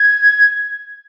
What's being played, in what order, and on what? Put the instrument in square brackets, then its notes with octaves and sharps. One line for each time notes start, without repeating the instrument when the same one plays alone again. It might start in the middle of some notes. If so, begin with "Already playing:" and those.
Already playing: [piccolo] G#6